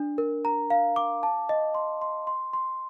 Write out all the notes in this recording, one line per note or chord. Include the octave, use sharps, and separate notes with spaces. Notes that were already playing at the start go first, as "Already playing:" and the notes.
Already playing: D4
A#4
A#5
F5
D6
A5
D#5
C6
C6
C6
C6